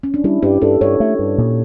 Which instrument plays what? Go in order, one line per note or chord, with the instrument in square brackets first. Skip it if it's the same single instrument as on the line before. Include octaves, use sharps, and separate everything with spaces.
[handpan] C#4
D4
[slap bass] G3 [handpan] E4
[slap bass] G2 [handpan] G4
[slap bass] G2 [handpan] A4
[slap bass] G2 [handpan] C#5
[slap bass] A3
G2
A#2